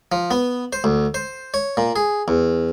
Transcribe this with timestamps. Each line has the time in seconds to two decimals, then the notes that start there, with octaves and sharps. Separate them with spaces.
0.12 F3
0.31 B3
0.73 C5
0.84 D2
1.14 C5
1.54 C#5
1.77 A#2
1.96 G#4
2.28 E2